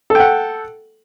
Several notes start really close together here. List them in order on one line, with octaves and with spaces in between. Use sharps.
A4 G5 F#5